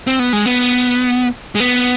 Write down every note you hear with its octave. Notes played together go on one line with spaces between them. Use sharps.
C4
B3
G#3
B3
G#3
B3